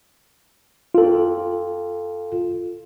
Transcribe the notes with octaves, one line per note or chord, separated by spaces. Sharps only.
F4 A4